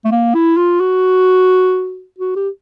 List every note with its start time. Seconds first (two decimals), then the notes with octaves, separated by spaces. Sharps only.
0.05 A3
0.11 A#3
0.34 E4
0.57 F4
0.80 F#4
2.18 F#4
2.36 G4